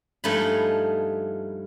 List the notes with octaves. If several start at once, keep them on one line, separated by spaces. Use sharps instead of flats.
G2 F3 A3 D#4 G#5 B5